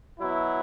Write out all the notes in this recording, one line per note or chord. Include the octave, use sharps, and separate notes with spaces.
B2 F#3 E4